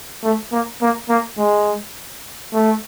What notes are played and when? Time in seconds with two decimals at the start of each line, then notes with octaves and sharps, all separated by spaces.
0.23 A3
0.52 A#3
0.81 A#3
1.09 A#3
1.38 G#3
2.53 A3